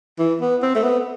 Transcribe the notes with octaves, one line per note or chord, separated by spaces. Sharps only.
E3
B3
C4
A3
B3